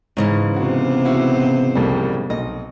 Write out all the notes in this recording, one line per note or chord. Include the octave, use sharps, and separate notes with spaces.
G#2 C#3 E3 C#4
C3 B3 F#4 C5
E4 F#4
C2 F2 G3
B1 D#5